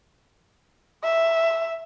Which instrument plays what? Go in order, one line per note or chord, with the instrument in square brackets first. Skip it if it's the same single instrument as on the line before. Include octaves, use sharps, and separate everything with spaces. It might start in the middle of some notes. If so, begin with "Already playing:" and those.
[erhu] E5